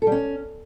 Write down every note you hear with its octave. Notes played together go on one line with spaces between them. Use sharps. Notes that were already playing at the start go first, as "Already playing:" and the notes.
A4
G3
C#4